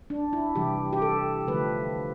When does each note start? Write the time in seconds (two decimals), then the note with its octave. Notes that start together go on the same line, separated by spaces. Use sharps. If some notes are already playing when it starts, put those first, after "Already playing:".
0.10 D4
0.33 E4
0.55 C3 E3 G3 G4
0.93 G4
1.02 A4
1.47 D3 F3 A3 B4